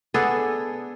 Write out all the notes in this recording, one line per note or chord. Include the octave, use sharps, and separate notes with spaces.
B3 D4 G#4 A4